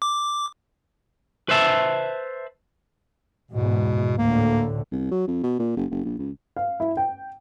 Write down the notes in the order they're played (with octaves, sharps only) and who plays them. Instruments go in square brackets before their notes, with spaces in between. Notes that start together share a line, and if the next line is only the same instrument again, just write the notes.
[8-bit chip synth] D6
[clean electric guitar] B4 C5 E5 A5
[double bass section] E2 G#2 [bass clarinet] B2
[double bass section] D2 A2 D3 [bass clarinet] A#3
[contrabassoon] C2
F#3
F2
B2
A#2
F#1
F#1
A#1
C#2
[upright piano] F5
E4
G5